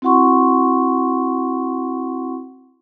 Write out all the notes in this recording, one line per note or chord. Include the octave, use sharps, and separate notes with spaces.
C4 E4 F#4 F#5 C6 C#6